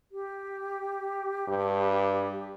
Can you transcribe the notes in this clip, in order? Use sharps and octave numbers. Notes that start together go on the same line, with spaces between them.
G4
G2